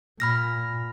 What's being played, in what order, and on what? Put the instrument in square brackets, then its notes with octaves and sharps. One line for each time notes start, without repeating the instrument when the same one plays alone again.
[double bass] A#2 [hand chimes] B5 F6 A#6